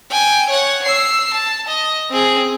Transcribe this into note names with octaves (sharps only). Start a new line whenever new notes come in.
G5 G#5
C#5 F#5
E6 C7
A5
D#5
C4 G#4